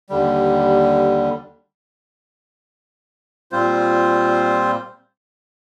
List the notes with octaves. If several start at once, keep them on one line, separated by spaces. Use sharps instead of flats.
D#2 D3 G3
A#2 G3 C4 F4 C5